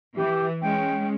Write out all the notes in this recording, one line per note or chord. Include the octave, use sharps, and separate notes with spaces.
E3 G4
G#3 C#4 G5